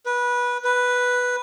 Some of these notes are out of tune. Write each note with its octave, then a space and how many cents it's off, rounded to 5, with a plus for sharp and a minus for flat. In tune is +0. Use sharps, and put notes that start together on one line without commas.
B4 -20
B4 +0